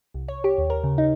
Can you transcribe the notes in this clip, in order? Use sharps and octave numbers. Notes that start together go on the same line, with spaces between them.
C2
C#5
G4
D#2
A#4
C#3
D#4